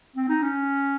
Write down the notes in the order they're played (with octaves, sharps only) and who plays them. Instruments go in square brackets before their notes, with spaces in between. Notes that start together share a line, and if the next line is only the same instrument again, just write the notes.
[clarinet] C4
D#4
C#4